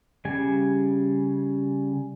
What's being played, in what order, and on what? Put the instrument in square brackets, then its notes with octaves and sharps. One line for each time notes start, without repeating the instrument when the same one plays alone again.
[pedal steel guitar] C#3 G3 G#5